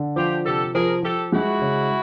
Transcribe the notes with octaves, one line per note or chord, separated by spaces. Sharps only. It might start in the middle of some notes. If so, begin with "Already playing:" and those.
Already playing: D3
F3 F4 G4
C3 G4 A4
F3 G#4 A#4
F3 G4 A4
G#3 E4 F#4
C#3